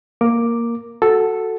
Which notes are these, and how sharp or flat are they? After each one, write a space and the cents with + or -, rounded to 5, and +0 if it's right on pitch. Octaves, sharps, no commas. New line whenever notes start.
A#3 +0 A#4 +0 D6 +0
F#4 +0 A4 +0